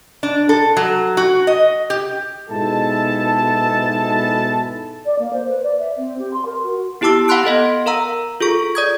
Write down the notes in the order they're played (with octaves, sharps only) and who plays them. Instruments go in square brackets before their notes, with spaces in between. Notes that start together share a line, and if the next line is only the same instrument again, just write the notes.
[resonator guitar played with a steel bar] D4
A4
F#3
F#4
D#5
G4
[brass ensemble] G#2 B2 G#3 E4 A4 A5
[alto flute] D5
A#3
C5
B4
D5
E5
C4
G4
C6
A#4
F#4
[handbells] B3 E4 G4 A5 D6 E6
F5 F#5 B5 C6 F#6 D7
B3 A4 D#5 F5
A#4 F5 A#5 E6
F4 G#4 A4 C#6
D5 D#6 G#6